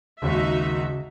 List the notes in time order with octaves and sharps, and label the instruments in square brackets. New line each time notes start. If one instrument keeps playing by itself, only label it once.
[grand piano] G#1 D#2 [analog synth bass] C#3 [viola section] D#4 F#4 E5